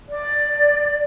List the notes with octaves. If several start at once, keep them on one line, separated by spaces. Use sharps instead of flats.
D5